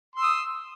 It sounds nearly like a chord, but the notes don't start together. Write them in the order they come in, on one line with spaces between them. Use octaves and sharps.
C6 E6 D#6